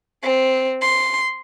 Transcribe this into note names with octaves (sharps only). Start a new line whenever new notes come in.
C4
C6